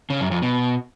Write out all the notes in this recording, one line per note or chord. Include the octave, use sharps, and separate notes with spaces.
C#3
F#2
F2
B2